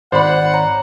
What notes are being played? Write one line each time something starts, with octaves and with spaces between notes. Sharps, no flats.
G#1 C5 D5 F#5 B5
C#5 A#5